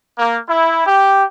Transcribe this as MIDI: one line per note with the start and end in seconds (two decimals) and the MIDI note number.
0.19 0.40 58
0.49 0.86 64
0.86 1.24 67